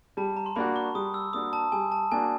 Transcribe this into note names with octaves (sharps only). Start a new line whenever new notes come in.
G3 A5
A#5
C6
A#3 D4 F#4 B5
C#6
G3 D#6
E6
A#3 D4 F#4 D#6
A5
G3 G#5
A5
A#3 D4 F#4 G#5